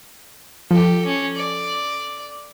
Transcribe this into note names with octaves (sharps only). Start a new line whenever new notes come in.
F3 G4 A4
C#4
D5